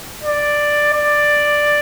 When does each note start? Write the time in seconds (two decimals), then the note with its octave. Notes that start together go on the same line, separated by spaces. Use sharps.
0.23 D5
0.93 D5